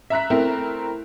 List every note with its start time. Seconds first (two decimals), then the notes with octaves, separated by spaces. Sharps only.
0.10 E5 A#5 F#6 B6
0.30 A3 C4 E4 A#4